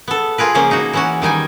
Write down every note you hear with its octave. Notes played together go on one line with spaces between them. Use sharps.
B3 A4
F4 G#4 A#4 B4
C#3 F3 A#3 C#4
D#4 F#4
E3 C#4 F#4
D#3 G3 D#4 G#5